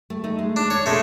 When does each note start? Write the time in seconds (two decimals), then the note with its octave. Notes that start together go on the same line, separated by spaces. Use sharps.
0.10 A3
0.24 A3 D#4
0.39 G#3
0.56 D4
0.70 C#5
0.86 B2 G#3 A3 D4